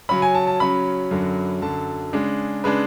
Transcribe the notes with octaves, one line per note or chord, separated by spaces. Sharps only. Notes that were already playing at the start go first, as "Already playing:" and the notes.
C#3 F#3 C#4 B5
G#5
A5
A5
C#3 F#3 C#4 B5
F#2 D3 F#3
F#2 D3 F#3 A5
C#3 G#3 D4
C#3 G#3 D4 B4